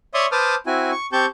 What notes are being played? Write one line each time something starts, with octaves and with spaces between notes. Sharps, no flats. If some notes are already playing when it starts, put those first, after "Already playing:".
C#5 D5 E5 C6 C#6 D#6
B4 C5 A5 D6 D#6 F6
C4 E4 F#4 G#5
C#6
C4 G4 A5 C#6 G6